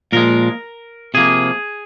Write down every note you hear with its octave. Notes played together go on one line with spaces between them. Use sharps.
A#2 F3 G#3 A#4
C3 F3 A#3 G#4